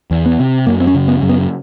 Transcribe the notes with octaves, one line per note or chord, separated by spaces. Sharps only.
E2
B3
C3
F#2 A#3
C4
C#4
C#3
B3
F#2
B3